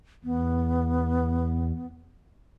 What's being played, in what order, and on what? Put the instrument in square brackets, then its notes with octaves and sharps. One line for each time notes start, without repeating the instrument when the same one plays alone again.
[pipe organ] E2 [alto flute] B3